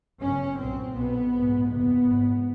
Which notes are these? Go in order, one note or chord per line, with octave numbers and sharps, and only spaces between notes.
G1 F#2 C#3 C#4
B1 A#2 C4
B1 B2 B3
A#1 G#2
F#1 F2 C3 B3
G#1 G#2